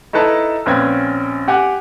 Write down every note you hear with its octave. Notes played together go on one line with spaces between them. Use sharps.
D#4 E4 A4 B4 A5 A#5
A#1 C4 C#4 B4 G5 G#6
G4 F#5 G#5 D6 F#6